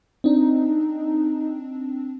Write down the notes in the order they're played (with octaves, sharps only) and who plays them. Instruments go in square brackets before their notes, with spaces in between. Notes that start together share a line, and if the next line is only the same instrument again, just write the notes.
[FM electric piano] C4 D4 [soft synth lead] D#4